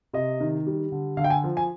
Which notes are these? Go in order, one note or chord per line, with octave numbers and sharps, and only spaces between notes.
C3 D#5
D#3
G3
D3
D3 F5
G5
G#5
F3
G#5